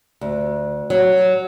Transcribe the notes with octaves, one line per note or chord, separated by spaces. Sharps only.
D2
F#3